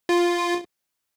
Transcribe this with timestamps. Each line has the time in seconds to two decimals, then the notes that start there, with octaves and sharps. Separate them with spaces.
0.09 F4